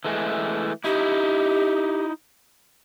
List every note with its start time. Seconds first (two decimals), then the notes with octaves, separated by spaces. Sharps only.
0.05 E3 G#3 A3
0.84 D#4 E4 G4